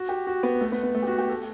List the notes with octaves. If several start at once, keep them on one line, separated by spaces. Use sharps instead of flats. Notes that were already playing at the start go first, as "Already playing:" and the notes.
Already playing: F#4
G4
F#4
B3
A3
B3
B3
A3
G4
F#4
G4
A4